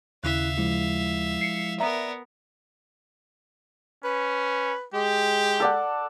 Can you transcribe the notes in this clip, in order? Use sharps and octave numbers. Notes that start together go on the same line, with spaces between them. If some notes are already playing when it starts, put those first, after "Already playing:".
D#2 C#3 E4 E5 F5 F#6
F3 G#3 E4
C7 C#7
B3 A#4 D5 E5 A#5
C#4 B4
G#3 G4
A4 D5 F#5